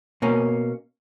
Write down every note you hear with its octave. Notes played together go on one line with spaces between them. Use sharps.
B2 A#3 C#4